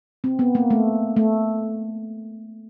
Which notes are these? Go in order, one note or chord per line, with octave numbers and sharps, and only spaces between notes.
C4
B3
A#3
A3
A3